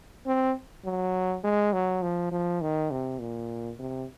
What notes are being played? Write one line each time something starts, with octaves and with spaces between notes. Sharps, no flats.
C4
F#3
G#3
F#3
F3
F3
D#3
C3
A#2
C3